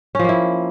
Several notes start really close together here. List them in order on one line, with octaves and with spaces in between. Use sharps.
C#4 F3 A#3 E4